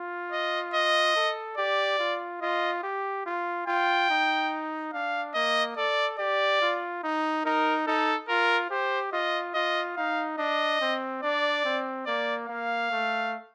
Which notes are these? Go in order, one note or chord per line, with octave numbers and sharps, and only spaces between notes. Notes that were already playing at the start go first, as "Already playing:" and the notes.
Already playing: F4
D#5
D#5
A4
G4 D5
F4
F4 D#5
G4
F4
F4 G5
D#4
D4 F5
A#3 D#5
A4 D5
G4 D5
F4
D#4
D#4 A#4
D#4 A4
F4 A#4
G4 C5
F4 D#5
F4 D#5
D#4 F5
D4 D#5
C4
D4 D5
C4
A#3 D5
A#3 F5
A3